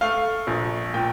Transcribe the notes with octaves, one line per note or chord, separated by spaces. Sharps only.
A3 F5
A#1
A#2 G5